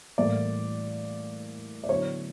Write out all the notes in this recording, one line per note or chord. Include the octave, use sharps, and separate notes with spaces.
A2 E3 G3 A#3 D5
D5
D3 F#3 B3 E4 C#5